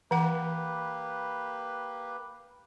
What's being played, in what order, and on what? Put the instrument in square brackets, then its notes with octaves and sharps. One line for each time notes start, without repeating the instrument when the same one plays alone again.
[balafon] E3 F#5 [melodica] A#3 G4 B4